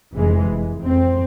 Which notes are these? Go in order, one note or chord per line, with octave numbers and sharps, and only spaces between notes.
F1 E3 G#3
F1
F2 C4